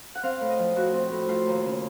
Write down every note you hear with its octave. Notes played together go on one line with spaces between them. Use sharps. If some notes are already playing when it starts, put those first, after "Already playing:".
F#5
C4 F5
A2
D#5
F3
A2 F#4
C4
A2
A3 F4
D#2
C#3